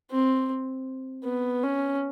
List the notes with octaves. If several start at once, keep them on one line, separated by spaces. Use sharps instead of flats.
C4
B3
C#4